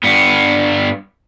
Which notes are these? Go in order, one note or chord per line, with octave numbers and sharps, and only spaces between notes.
G2 B3